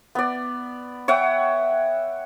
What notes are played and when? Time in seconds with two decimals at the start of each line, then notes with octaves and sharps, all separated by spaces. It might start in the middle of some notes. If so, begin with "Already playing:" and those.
0.15 B3 D5
1.08 C#5 E5 F#5 G5